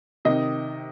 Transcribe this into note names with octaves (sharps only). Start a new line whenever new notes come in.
C3 D#3 D#5